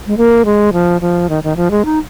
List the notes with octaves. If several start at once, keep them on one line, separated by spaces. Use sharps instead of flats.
G#3
A#3
G#3
F3
F3
D#3
D#3
F3
G#3
D#4